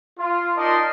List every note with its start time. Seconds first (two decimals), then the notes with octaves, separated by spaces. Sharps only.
0.19 F4
0.57 D#4 A#4 D5 D#5 A5 C6